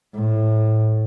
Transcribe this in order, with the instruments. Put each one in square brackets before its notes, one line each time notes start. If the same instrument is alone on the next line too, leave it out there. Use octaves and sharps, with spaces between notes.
[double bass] A2